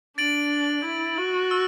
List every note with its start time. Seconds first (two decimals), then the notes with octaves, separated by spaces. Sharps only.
0.18 D4 A6 D7 F#7
0.84 E4
1.18 F#4
1.51 E6